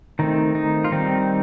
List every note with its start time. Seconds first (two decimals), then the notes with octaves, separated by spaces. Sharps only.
0.19 D#3 A3 C4 D#4
0.55 D#4
0.85 F4
0.92 D#3 G3 C4 D#4